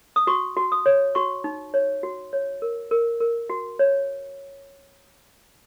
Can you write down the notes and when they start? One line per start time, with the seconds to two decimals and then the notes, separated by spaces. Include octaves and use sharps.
0.16 D#6
0.27 F#4 C#6
0.56 F#4
0.72 D#6
0.86 C#5
1.15 F#4 C#6
1.44 D#4
1.74 C#5
2.03 F#4
2.33 C#5
2.62 A#4
2.91 A#4
3.20 A#4
3.50 F#4
3.79 C#5